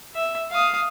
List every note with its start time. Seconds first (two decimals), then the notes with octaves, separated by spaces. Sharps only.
0.15 E5
0.51 F5 D#6